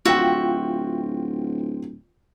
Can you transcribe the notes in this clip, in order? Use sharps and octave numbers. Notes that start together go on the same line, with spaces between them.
D1 F4 F#4 E5 G5